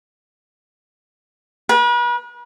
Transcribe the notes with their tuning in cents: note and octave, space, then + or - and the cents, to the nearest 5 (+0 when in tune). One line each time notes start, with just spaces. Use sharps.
B4 -40